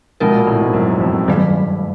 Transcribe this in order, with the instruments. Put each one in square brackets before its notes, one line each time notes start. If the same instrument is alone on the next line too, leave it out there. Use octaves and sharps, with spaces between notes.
[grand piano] B2 [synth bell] F3 G#3 C4 F4 A#4
[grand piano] A#2
A2
G#2
F#2
F2
[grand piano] G2 [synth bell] D#3 F#3 A3